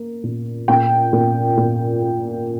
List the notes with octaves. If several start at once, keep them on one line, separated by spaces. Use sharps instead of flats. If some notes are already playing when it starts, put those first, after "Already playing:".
Already playing: A#3
A#2
A#2 G5
A#2
A#2
A#3